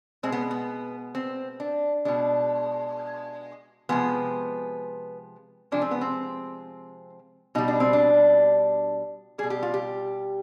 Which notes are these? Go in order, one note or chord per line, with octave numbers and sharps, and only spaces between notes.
B2 G#3 C4
B3
B3
C4
D4
B2 G#3 D4
C3 F3 G#3 B3
C3 F3 G#3 D4
C4
B3
C4
B2 G3 D#4
D4
C4
D4
B2 G3 G#4
G4
F4
G4